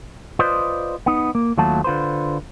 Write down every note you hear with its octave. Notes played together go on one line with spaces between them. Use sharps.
F4 B4 C5 D5 D#5
B3 D#4
A#3
D#2 F#3 A3 F4 F#4 A5
D3 F4 B4 C5